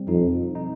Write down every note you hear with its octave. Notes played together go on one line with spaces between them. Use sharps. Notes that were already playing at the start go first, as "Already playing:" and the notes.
Already playing: G3 C4
F2 D#4
D#4